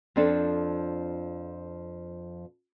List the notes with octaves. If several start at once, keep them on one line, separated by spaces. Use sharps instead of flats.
F2 F3 C4 D4 A4